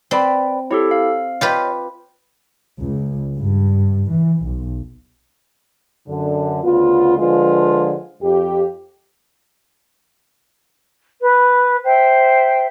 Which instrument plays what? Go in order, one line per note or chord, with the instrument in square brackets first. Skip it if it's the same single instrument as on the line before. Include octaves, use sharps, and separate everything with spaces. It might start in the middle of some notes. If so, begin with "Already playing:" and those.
[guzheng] C4 [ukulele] B4 D5 B5
[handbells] E4 G4 A4 [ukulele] C#5
[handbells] F5
[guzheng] F4 G4 B4 [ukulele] C#5 D#5
[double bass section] C#2
G2
E3
B1
[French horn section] F#2 D3
D2 C#3 B3 F4
D3 F3 G#3 F4 B4
F2 G4
[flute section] B4
C5 E5 G5